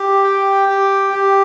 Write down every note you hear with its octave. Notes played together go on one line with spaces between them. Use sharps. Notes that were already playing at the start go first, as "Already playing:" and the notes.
Already playing: G4
G5
G4
G4